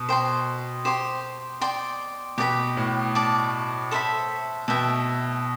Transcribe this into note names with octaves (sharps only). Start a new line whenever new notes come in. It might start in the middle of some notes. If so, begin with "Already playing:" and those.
Already playing: B2
C5 G5 C6
G4 C5 G5 C6
D5 G5 C6
B2 G4 D5 G5 B5
A2
D5 A5 D6
A4 C5 E5 B5
B2 A4 E5 G5